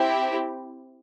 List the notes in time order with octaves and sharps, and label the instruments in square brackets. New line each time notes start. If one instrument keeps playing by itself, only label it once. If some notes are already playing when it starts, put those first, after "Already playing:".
Already playing: [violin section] C4 E4 G4